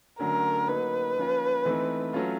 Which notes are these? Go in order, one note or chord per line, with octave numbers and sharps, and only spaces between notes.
D3 F#3 A3 C#4 A#4
F#3 A#3 D#4 B4
F3 A#3 C#4 F4
E3 A3 C4 D#4
F#3 A3 C#4 F4